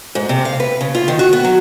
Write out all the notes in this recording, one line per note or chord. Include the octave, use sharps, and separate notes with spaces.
G#2
C3
F5
B4
C#3
F4
D#3
F#4
B3
F#3